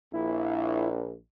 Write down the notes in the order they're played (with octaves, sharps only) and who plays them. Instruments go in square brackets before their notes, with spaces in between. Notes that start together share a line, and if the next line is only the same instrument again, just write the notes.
[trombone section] A#1 [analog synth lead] E4